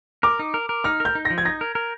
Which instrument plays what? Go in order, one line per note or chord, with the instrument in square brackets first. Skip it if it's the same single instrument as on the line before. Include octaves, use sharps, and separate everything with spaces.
[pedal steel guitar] A#4 [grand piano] D6
[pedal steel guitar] D#4
A#4
A#4
[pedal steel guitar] D#4 [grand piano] F6
[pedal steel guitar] A#4
[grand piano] G6
[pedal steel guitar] D#4
[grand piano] A#6
[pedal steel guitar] F3
[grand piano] G#6
[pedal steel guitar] D#4 [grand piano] A#6
[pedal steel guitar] A#4
A#4